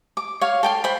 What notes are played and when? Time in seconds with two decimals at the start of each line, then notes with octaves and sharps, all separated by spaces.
0.17 D6
0.41 C#5 F5
0.63 A4 G5 C6
0.84 C5 B5